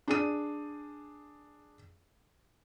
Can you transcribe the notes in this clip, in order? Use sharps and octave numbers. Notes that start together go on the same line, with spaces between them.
D4 G#4 D#7